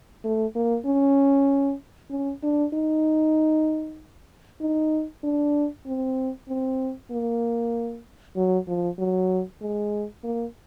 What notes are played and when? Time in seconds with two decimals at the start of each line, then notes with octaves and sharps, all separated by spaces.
0.24 A3
0.56 A#3
0.86 C#4
2.11 C#4
2.43 D4
2.74 D#4
4.61 D#4
5.23 D4
5.86 C4
6.49 C4
7.11 A#3
8.36 F#3
8.68 F3
8.98 F#3
9.62 G#3
10.24 A#3